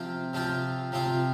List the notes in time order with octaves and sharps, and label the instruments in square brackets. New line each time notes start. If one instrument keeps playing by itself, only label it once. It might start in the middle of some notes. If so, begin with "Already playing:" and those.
Already playing: [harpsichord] C3 F3 C4 F4
C3 F3 C4 F4
C3 F3 C4 F4